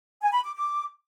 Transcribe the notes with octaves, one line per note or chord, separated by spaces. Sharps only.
G#5
B5
D6
D6